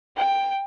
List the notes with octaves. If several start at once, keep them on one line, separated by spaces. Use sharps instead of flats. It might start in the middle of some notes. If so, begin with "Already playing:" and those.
G5